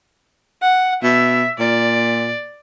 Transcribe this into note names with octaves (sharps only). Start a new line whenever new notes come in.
F#5
B2 E5
A#2 D5